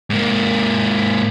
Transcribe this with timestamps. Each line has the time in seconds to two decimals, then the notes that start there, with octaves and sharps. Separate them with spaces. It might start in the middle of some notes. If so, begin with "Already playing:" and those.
0.10 G#2 A#3